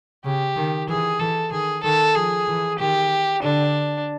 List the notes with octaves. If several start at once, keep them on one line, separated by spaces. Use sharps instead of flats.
C#3 G4
D#3
E3 G#4
E3 A4
D#3 G#4
D#3 A4
F3 G#4
E3
D#3 G4
D3 D4